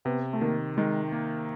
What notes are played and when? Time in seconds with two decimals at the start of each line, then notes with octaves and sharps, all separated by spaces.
0.05 C3 B3
0.33 A3
0.41 D#3 A#3
0.77 D#3 G#3
1.12 A#3